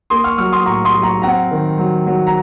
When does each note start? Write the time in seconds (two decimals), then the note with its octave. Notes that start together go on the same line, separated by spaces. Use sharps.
0.10 A#3 C6 D#6
0.24 C#6 F6
0.38 F#3 C#6 F6
0.52 C6 D#6
0.66 A2 A#5 C#6
0.85 C6 D#6
0.95 F#3
1.03 A#5 C#6
1.22 C4 F#5 A#5
1.51 D#3
1.78 F#3
2.07 F#3
2.27 A#5